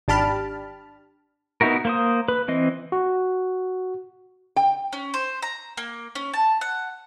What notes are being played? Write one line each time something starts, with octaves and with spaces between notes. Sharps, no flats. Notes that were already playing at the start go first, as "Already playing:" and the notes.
G#1 D4 G4 A5 B5 F6
B3 D#4 E4 F#4 A#4
A#3 C5 D#6
B4
E3 C4 D#5
F#4
G5
C#4
C5
A#5
A#3
C#4
A5
F#5